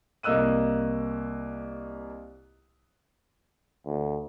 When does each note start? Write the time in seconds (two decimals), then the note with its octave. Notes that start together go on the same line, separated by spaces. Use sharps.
0.23 C2 A#3 D#5 E6 F#6 D#7
3.86 D2